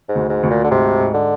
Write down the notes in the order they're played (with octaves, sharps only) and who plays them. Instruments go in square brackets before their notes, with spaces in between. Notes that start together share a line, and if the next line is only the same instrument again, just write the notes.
[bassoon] G#2
[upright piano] D2
[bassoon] G#2
[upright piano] D2
[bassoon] A#2
D3
[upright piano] G#2 [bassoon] C3
[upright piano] G#2
[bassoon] D3